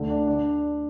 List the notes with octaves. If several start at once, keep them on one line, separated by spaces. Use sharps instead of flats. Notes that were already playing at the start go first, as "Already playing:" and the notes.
Already playing: D2
D4
D4